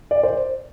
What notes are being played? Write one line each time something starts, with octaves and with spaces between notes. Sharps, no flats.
D5
C5